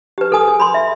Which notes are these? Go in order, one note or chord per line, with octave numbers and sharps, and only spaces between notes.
G4 B4
A4 A#4 G#5 D#6
G#4
B5 C6
E5